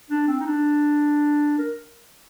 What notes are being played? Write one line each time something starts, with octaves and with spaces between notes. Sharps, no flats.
D4
C4
D#4
D4
A#4